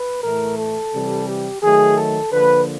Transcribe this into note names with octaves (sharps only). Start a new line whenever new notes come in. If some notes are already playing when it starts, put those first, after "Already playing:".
Already playing: B4
A2 E3 A3 A#4
A4
C3 E3 G3
G4
D#3 F#3 A3 G#4
A4
D3 F3 A#3 B4